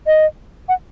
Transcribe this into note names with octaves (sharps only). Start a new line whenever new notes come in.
D#5
F#5